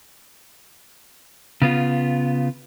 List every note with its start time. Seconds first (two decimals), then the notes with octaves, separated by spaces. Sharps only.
1.62 C#3 B3 F4